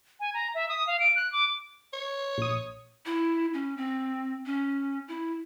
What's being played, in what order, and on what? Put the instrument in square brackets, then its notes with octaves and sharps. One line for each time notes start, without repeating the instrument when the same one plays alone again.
[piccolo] G#5
A#5
E5
D#6
F5
D7
F#6
D6
[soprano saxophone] C#5
[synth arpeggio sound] A#1 D#6
[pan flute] E4
C#4
C4
C#4
E4